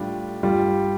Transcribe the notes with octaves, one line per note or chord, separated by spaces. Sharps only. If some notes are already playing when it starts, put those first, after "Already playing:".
Already playing: A2 G3 D4 F4
G2 G3 F4